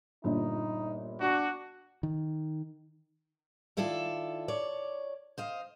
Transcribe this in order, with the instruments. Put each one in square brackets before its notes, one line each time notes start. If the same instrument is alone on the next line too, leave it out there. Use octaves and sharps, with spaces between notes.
[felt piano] G1 A#2 [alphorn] D#4
[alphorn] D4 [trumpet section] F#4
[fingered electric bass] D#3
[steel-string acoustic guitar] D#3 E4 F4 A4 D5 E5
C#5 D5
C5 D#5 F5